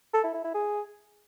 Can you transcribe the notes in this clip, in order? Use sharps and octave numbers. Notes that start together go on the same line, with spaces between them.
A4
E4
E4
E4
G#4